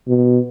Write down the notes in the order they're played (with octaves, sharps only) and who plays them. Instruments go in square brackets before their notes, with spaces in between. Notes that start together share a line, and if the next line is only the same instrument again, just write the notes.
[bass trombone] B2